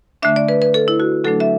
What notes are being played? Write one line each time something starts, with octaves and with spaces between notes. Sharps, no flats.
D3 A3 D4 E5
D5
B4
B4
A4
E4
F#4
D3 F#3 A3 D4 A4
E5